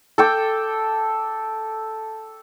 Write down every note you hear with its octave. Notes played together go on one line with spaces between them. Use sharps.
A4 G5 D6